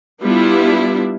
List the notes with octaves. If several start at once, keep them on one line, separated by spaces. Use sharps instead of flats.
G3 B3 D4 E4 F4